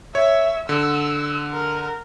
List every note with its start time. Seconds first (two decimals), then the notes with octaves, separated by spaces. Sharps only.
0.15 C#5 E5
0.69 D3 E6
1.53 A#4